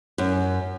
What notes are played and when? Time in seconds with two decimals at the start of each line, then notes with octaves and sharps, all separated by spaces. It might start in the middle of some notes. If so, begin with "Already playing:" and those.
0.18 F#2